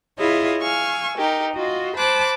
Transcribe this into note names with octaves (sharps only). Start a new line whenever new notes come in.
E4 F4 G#4 C#5 D#5
F5 G#5 C#6 E6
D#4 G4 A#4
F4 F#4 D#5
C5 A5 B5 D6 F#6